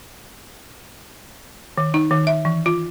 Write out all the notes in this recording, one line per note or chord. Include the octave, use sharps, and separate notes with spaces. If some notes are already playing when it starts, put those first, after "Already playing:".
D#3
D#4
D#3
E5
E3
F4